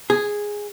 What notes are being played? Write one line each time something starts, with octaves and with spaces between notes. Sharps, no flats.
G#4